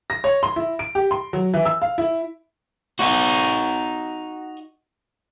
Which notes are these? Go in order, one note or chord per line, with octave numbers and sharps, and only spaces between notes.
A#6
C#5
C6
E4
D7
G4
C6
F#3
E3
E6
F5
E4
D#4 F#4